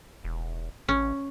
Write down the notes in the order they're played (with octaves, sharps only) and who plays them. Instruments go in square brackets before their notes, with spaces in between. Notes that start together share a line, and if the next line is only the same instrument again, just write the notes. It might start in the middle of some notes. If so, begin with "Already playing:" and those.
[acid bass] E1
[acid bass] A1 [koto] C#4